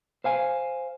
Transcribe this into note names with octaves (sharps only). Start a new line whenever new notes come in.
C5 F5 G#5